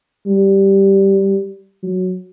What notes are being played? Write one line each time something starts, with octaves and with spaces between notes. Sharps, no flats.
G3
F#3